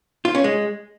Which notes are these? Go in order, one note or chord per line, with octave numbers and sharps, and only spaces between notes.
F4
C#4
G#3